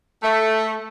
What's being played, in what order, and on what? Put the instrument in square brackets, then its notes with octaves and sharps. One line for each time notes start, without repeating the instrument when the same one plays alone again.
[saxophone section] A3